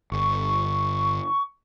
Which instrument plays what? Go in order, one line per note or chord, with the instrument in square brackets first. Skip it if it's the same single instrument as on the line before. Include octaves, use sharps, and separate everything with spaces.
[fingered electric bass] G1 [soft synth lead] C#6